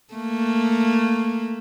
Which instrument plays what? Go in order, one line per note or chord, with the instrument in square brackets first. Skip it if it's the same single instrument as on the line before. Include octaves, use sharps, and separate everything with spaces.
[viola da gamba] A3 A#3